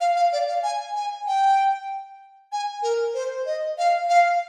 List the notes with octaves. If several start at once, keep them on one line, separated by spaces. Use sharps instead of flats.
F5
F5
D5
F5
G#5
G#5
G5
G#5
A#4
C5
D#5
F5
F5